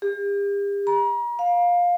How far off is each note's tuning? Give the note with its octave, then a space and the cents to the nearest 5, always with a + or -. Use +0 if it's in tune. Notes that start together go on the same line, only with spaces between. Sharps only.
G4 +40
A#5 +40
F5 +15